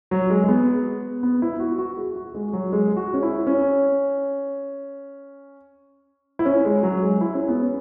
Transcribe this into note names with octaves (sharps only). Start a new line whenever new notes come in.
F#3
G#3
G#3
B3
B3
E4
F#4
F#4
F#4
G#4
F#4
G#3
F#3
G#3
F#4
C#4
E4
C#4
E4
C#4
G#3
F#3
G#3
E4
C#4
B3
C#4